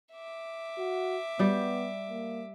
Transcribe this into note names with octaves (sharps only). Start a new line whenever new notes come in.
E5 D6
F#4
G3 B3 G4
A#3